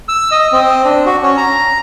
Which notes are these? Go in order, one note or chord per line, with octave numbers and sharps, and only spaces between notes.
E6
D#5
C4
D4
F#4
C#4
A#5